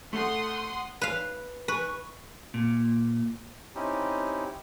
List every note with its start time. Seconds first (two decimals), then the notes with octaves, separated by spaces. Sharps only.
0.13 A3 F#5 C6 D#6
1.01 B4 F5
1.68 B4 C#6
2.54 A#2
3.75 C4 C#4 D#4 E4 G4